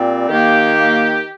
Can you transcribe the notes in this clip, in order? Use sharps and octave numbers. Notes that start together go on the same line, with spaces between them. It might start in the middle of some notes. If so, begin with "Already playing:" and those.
Already playing: A#2 G3 C4
D#3 A#3 G4